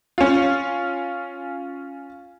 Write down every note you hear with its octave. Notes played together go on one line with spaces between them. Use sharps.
C#4 F4